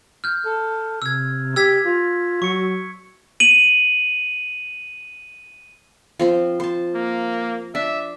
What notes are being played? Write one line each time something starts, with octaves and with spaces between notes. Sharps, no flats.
F6 G6
A4
C3 E6 G#6
G4 E6 G#6 B6
F4
F#3 C#6 C#7
D#7 F#7
F3 C4 C5
C5 A5
A#3
D4 E5